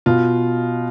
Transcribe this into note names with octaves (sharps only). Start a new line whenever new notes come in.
B2 F4